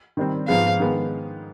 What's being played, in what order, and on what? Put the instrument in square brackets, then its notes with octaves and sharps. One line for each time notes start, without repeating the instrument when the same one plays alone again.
[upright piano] D#3 G3 C4
[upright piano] G#2 F3 G#3 B3 [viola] F5
[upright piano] D#3 G#3 B3